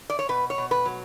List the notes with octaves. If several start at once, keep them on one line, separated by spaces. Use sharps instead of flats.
D5
C#5
B2 B4
C#5
B2
B4
F#3